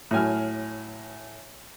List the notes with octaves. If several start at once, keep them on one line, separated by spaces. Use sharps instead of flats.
A2 F#3 G#5 F6